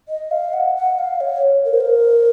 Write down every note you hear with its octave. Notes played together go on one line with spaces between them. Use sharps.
D#5
F5
F#5
F#5
F5
C#5
A#4
C5
A#4